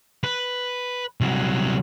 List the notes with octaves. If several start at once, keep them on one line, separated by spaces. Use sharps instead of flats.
B4
C2 F#3